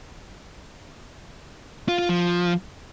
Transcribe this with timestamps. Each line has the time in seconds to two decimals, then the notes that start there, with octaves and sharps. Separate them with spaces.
1.89 F4
1.99 F4
2.09 F3